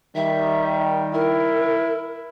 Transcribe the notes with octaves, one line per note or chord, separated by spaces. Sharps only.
D#3 G3 E5
E4 A#4